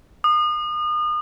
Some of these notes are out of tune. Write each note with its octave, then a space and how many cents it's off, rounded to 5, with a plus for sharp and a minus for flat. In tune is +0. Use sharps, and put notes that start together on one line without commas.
D#6 -35